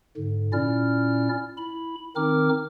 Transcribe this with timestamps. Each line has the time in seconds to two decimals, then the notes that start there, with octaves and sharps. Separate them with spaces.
0.17 G#2 D3
0.53 A#2 C#4 E4 D5 F6
1.58 E4 B5
2.16 D#3 C4 D#4 A#4 D6 F6